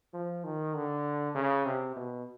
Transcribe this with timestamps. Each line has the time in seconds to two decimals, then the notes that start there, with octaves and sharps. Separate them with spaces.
0.14 F3
0.44 D#3
0.75 D3
1.35 C#3
1.65 C3
1.96 B2